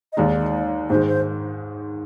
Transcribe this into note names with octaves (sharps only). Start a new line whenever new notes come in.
D#5
D#2 D#3 G#3 D#4 D5
G#2 D#3 G#3 C5
C5